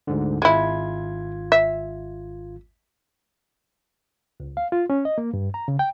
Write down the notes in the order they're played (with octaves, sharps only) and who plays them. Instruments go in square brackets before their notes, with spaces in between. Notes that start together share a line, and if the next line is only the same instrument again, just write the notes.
[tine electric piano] D2 G#2 D3
[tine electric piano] G#1 F4 G#6 [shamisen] G#3 E4
[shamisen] E5
[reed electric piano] C#2
F5
F4
C#4
D#5
A#3
G2
A#5
C#3
G5